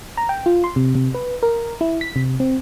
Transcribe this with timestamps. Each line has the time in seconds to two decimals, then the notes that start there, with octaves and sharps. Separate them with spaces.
0.17 A#5
0.29 G5
0.46 F4
0.64 C6
0.76 C3
0.95 C3
1.14 B4
1.43 A#4
1.81 E4
2.01 B6
2.16 C3
2.40 C4